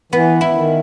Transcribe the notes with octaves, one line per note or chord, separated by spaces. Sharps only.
E3 B3
E4
D#3